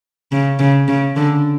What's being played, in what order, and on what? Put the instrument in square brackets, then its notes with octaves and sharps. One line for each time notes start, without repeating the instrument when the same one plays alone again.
[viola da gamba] C#3
C#3
C#3
D3